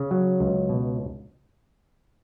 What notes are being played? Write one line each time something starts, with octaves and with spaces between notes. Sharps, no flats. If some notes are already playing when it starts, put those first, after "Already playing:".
Already playing: C#3
F#3
C#2
B2